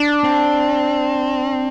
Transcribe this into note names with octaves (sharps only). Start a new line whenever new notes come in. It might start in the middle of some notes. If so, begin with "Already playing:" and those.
Already playing: D4
C4